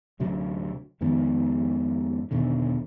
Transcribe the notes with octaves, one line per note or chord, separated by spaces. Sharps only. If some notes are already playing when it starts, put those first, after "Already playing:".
D1 D2 C3 F#3
F2 G#2 D#3 B3
E2 B2 D3 D#3